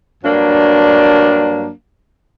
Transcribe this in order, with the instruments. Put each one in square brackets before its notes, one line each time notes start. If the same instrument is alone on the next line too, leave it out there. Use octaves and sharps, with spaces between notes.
[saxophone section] G2 F#3 A#3 D4